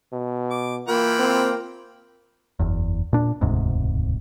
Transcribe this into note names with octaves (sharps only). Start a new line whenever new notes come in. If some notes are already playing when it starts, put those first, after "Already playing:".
B2
D6
E3 A#3 F4 A#4 G5 B5
C4
F#1 E2
A#2 D4
E1 D2 G#2 C3